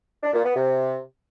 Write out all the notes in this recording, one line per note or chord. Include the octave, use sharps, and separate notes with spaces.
D4
A#2
B3
C3